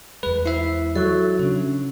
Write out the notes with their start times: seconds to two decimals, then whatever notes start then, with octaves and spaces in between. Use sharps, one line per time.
0.23 E2 G#3 B4
0.46 E4 C5 E5
0.96 F#3 A4
1.39 C#3 C#4 D4